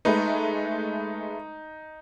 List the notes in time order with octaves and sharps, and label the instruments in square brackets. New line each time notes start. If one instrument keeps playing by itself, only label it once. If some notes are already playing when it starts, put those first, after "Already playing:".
[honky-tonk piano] G#3 A3 B4 [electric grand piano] D#4